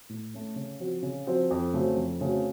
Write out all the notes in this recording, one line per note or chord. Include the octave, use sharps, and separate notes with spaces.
A2
A3 C#4
C#3
F3 C4 F#4
C#3
F3 C4 F#4
F2
C#3 A3 C4 F#4
F2
C#3 A3 C4 F#4